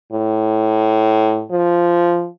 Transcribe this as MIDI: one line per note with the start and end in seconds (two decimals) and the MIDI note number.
0.12 1.44 45
1.51 2.28 53